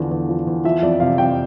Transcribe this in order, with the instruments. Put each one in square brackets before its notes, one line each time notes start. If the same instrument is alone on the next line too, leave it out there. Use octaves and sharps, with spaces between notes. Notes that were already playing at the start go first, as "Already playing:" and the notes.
Already playing: [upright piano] E2 D3 F3
E2
F3
E2
F3 E5
F2 D5
C3 F5
F2 G5